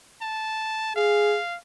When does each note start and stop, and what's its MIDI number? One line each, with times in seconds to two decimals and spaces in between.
0.21 0.93 81
0.96 1.36 68
0.96 1.56 77